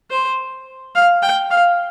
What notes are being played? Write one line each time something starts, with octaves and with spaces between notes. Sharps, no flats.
C5
F5
G5
F5